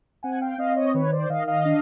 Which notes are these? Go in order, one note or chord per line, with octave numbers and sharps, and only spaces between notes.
C4 F#5 G#5
F5 G5
C4 D#5 F5
C#5 D#5
D#3 B4 C#5
C5 D5
D#3 D#5 F5
D#5 F5
D4